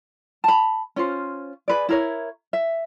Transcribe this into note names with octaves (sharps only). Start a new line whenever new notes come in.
A5 B5
C#4 F4 C5
G#4 B4 D5
E4 A#4 C#5
E5